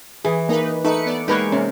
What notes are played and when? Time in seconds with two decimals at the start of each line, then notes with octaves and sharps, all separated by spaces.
0.25 E3 G#4
0.49 A#3 D#4 B4
0.84 A3 D#4 B4 C#7
1.06 B3 D5
1.28 G#3 A#3 D#4 G4 A#4 B4 C#5
1.52 C3 C#4